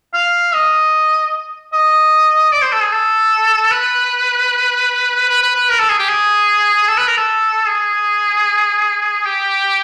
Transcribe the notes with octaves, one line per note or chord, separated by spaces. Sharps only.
F5
D#5
D#5
D5
C5
A4
G#4
A4
B4
B4
B4
B4
A#4
A4
G#4
G4
G#4
A4
B4
A#4
A4
G#4
G4